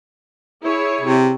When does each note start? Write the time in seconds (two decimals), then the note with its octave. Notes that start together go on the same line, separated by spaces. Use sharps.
0.64 E4 G#4 C#5
1.01 C3